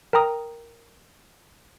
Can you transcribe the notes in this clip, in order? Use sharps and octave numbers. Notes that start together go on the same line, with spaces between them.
A#4 G5 A#5 D#6